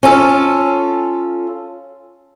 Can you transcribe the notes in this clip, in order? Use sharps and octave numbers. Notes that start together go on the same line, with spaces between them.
C#4 F4 A4